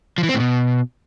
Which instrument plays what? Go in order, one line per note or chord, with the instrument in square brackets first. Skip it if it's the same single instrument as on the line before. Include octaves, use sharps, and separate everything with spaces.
[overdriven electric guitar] F3
E3
C4
A2
B2